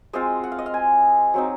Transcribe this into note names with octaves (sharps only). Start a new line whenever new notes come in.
G#3 C4 F4 D#5
F#5
F5
D#5
F5
G#5
F#3 C4 D#4